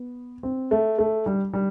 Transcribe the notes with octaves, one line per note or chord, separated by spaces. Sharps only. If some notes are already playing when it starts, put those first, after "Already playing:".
Already playing: B3
C4
A3
A3
G3
G3